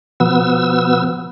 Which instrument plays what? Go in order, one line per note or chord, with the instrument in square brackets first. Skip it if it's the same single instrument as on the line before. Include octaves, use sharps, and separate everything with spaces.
[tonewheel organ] B2 B3 E6 [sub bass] F3